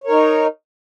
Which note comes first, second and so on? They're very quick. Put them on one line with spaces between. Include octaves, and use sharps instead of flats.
C#5 A#4 D#4